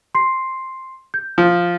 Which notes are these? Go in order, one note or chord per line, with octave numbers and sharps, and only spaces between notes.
C6 C7
G6
F3